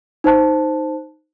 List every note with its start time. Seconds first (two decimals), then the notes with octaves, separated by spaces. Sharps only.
0.24 D#4 C5 A5 F#6